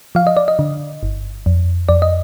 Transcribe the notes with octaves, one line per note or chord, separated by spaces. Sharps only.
F3 F5
D#5
D5
D#5
D3
G1
F2
F2 D5
D#5